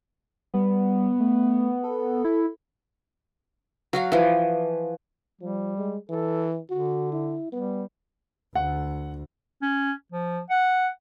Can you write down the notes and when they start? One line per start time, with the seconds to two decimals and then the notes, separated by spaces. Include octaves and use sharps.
0.54 G3 B3
1.20 A3
1.83 A4
2.25 E4
3.93 F#3 F#4 F5
4.12 E3 F3
5.41 F3 G3
5.77 G#3
6.09 E3 A4
6.70 D3 F#4
7.12 E4
7.52 G3 B3
8.55 D2 F#5
9.62 C#4
10.12 F3
10.50 F#5